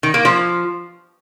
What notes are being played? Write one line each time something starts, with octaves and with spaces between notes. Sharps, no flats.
D#3
A#3
F3